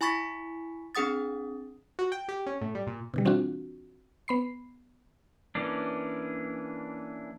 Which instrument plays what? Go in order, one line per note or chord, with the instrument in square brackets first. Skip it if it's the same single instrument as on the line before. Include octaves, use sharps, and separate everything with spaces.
[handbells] E4 G#5 B5 C#6 A6 B6
C4 D4 G#4 F#5 D#6 A6
[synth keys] F#4
G5
G4
C#4
A2
G3
A#2
[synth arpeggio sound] B2 D3 G3
E3 C4 D4 F4 F#4
B3 B5 C7
[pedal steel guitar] E3 A#3 C#4 D4